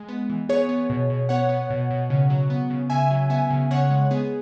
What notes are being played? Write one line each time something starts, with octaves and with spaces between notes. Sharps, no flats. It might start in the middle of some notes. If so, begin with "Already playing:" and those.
Already playing: G#3
B3
E3
B3 G#4 C#5
B3
B2
B2
B3 C#5 F#5
B3
B2
B2
C#3
F#3
B3
C#3
C#3 E5 G#5
F#3
B3 E5 G#5
C#3
C#3 C#5 F#5
G#3
B3 G#4